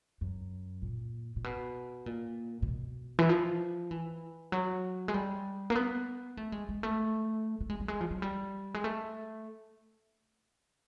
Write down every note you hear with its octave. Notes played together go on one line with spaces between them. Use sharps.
F#2
A#2
A#2
B2
A#2
A#2
B2
E3
F3
E3
F#3
G#3
G3
A#3
B3
A3
G#3
G#3
A3
A3
G#3
G3
G#3
F3
F#3
G3
G#3
A3